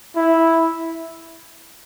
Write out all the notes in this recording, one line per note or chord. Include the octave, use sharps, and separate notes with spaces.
E4